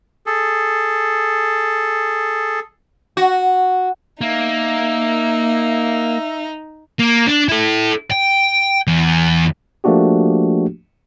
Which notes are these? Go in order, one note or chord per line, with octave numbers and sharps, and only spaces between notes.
G#4 A4
F#4
A#3 D#4 E5
A#3
D4
E4 A4
G5
E2
F3 A3 A#3 D4 F#4 G4